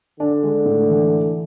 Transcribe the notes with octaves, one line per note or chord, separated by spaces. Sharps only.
D3 D4
G#3
A2
E3